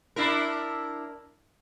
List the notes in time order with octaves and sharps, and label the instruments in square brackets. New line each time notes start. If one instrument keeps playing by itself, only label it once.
[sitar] D4 E4 A#4